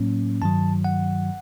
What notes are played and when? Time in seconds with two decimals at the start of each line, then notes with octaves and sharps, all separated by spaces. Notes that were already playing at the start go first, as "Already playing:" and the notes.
Already playing: A2 F#3 A#3 C#4
0.42 G2 D#3 F#3 A5
0.84 F#5